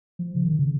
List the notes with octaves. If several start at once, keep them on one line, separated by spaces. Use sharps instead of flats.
F3
C#3
D#3
C#3